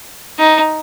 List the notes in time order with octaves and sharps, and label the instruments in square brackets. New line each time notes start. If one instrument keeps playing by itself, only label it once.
[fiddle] D#4